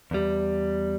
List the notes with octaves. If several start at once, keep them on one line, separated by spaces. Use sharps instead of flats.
E2 G3